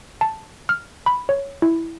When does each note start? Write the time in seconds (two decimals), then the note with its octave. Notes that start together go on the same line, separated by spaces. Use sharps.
0.21 A5
0.69 F6
1.06 B5
1.29 C#5
1.62 E4